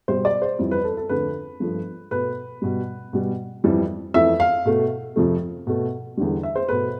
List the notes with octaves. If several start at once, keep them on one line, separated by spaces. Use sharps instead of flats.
B2 G3 C5
D5
C5
F2 E3 G3
B4
A4
A4
F2 D3 A3 B4
G2 F3 A3
B2 A3 B4
B2 G3
B2 G3
F2 E3 G3
F2 E3 A3 E5
F5
B2 A3
F2 C3 F3 A3
B2 A3
E2 D3 G3
E5
C5
B2 A3 B4